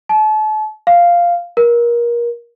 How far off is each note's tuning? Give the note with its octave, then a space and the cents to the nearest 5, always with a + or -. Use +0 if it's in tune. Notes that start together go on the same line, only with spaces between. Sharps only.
A5 -35
F5 -5
A#4 +25